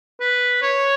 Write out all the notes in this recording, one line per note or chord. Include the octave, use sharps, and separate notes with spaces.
B4
C#5